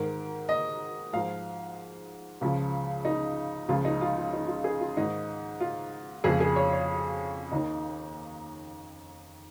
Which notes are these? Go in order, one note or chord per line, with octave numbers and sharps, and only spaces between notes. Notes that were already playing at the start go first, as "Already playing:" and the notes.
Already playing: G#2 D#3 A#4
D#5
G#2 F3 F5
C#2 C#3 F3
D#4
C#2 C#3 F3 F4
D#4
F4
F4
D#4
F4
G#4
F4
G#2 D#3 D#4
F4
F2 C#3 F3 G#4
G#4
C#5
C#5
D#2 D#3 D#4